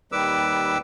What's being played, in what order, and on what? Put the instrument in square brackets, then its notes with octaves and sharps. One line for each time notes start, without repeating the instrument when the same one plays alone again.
[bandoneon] D#2 D#3 G3 B4 D6 E6